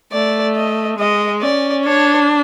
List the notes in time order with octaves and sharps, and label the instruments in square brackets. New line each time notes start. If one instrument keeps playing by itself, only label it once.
[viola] A3 [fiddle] D5
[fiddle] D#5
[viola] G#3 [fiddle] D#5
[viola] C#4 [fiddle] D5
[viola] D4 [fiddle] C#5